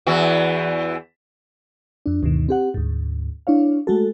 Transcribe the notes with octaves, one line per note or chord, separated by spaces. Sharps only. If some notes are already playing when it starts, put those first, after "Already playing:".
E2 E3 F#4
F2 D4
D2 G2 B2 D#3
C4 G4 F#5
D2 G#2
D4 E4 C#5 F5
G#3 A3 F#4 A4